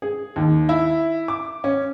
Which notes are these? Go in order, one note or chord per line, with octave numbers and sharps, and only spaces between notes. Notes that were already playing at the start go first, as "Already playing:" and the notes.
G#4
D#2
E4
D6
C#4